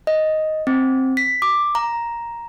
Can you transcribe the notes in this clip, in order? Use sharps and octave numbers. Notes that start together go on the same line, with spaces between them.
D#5
C4
B6
D6
A#5